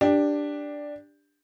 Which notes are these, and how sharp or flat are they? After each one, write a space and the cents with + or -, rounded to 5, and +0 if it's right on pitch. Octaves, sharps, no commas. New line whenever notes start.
D4 +0 G4 +10